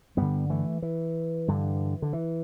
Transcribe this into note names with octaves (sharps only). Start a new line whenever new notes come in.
G2 D3 G3 B3
E3 A3
E3
G2 D3
D3
E3